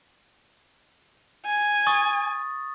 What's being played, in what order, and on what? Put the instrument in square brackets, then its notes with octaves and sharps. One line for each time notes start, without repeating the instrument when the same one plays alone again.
[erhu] G#5
[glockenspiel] C#6 D#6 A6